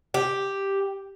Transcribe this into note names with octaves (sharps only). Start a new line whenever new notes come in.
G4